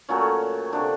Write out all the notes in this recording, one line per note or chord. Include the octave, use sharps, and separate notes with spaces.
A#2 F#3 A3 C#4
C3 F3 A3 D4